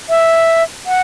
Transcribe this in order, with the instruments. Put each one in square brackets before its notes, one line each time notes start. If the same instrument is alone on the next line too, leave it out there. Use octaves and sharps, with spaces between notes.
[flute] E5
F#5